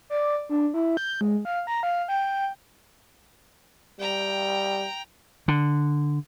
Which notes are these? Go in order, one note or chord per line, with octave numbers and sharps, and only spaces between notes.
D5
D4
E4
G6
G#3
F5
A#5
F5
G5
G3 G5 A#5
D3